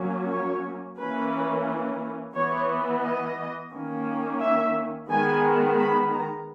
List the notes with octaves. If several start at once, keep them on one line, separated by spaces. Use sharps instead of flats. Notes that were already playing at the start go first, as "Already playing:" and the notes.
Already playing: F#3 A#3 C#4
C#5
E3 A#3 C#4 B4
E3 B3 C#5
D#5
D#3 A#3 C#4
E5
D#3 G#3 B3 G#5
B5
A#5